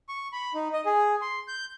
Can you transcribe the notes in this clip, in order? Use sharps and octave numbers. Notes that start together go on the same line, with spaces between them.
C#6
B5
D#4
D#5
G#4
C6
G6